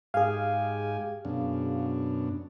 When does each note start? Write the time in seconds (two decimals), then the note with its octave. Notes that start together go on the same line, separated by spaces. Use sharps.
0.14 G#2 G4 G#4 F5 G#5
1.25 F#2 B2 D4